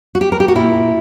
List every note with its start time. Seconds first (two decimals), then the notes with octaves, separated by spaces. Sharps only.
0.15 F#4
0.21 G4
0.32 A#4
0.40 G4
0.48 F#4
0.55 A#2 E4